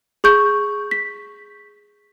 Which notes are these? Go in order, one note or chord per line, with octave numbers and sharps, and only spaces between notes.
G#4 C#6 G6
B6